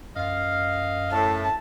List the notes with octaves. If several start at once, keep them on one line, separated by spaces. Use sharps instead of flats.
F#2 D#5 F5
A2 A5